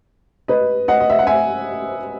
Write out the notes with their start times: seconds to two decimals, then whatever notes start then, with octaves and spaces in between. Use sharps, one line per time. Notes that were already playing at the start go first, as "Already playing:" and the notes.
0.48 B4 D#5
0.88 D#5 F#5
1.00 D#5
1.10 E5
1.19 F#5
1.27 E5 G#5